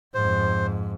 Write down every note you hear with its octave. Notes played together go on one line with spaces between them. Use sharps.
F2 G#2 C5